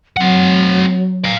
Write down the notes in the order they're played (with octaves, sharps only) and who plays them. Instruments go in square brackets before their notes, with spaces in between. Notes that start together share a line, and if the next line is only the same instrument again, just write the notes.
[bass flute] F#3 [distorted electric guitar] C4 F#5
[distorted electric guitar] D5 F5